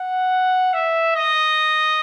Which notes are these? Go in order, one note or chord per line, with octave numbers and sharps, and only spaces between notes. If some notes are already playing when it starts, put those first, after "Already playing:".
Already playing: F#5
E5
D#5